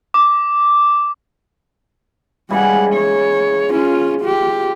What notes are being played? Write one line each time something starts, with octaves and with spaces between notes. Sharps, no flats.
D6
C#3 E3 G3 G#3 F#5
C#5
C#4 F4
F4 G4